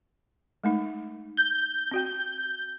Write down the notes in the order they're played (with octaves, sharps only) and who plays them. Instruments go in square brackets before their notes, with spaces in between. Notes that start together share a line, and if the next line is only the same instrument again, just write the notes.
[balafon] G#3 A3 D#4
[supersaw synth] G6
[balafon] C4 F#4 G5